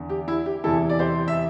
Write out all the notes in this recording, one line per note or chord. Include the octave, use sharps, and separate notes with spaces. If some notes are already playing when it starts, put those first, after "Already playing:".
Already playing: E2 D3
G4
E4
G4
E2 C3 E3 E4 A4
D5
G4 C5
E5